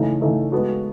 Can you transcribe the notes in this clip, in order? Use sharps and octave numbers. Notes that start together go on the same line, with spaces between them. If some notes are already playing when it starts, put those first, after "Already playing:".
Already playing: C#3 E3 A3 D#4
C#3 E3 A3 D#4
G#3 B3 F#4 A4